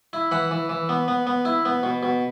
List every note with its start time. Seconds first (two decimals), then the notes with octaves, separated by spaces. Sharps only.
0.13 E4
0.31 E3 F#5 B5
0.51 E3
0.69 E3
0.89 B3
1.08 B3
1.27 B3
1.45 E4
1.65 B3
1.83 B2
2.03 B2